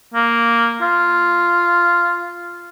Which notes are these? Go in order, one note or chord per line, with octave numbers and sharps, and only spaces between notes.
A#3
F4